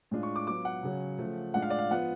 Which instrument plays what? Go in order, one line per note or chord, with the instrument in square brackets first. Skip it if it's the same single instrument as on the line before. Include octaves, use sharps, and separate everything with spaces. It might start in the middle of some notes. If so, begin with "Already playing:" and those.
[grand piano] A2 G#3 D4 F4
C#6
D6
F#3 B3 F4 D6
F#5
C#3 F#3 C#4
C#3 F3 A3
A2 G#3 D4 F4 F#5
F5
D5
F5
F3 B3 F4 F#5